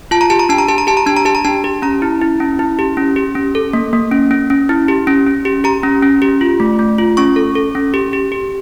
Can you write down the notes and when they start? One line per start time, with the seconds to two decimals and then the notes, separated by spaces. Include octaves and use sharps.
0.11 F4 A5
0.21 A#5
0.30 G4 A5
0.39 A#5
0.49 D4 A5
0.58 A#5
0.68 G4 A5
0.78 A#5
0.87 G4 A5
0.97 A#5
1.06 D4 A5
1.16 A#5
1.25 G4 A5
1.35 A#5
1.45 D4 A5
1.64 G4
1.82 C#4 A#5
2.02 E4
2.21 E4
2.40 C#4
2.59 E4
2.79 G4
2.97 C#4
3.16 G4
3.35 C#4
3.55 A4
3.73 A#3
3.93 A#3
4.12 C#4
4.31 C#4
4.50 C#4
4.69 E4
4.88 G4
5.07 C#4
5.27 C#4
5.45 G4
5.64 G4 A#5
5.83 C#4
6.03 C#4
6.22 G4
6.41 F4
6.60 A3
6.79 A3
6.98 F4
7.17 C#4 C#6
7.36 A4
7.55 A4
7.75 C#4
7.94 G4
8.13 G4
8.32 G4